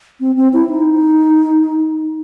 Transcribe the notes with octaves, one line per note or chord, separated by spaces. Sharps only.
C4
C4
E4
D#4